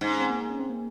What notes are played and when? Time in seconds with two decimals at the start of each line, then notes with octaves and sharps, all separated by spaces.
0.01 G#2 D#4
0.10 C#4
0.21 C4
0.30 A#3
0.40 A#3
0.50 C#4
0.59 C4
0.69 A#3